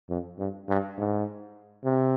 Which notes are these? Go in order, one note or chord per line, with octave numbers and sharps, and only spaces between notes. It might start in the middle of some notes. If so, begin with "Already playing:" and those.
F2
G2
G2
G#2
C3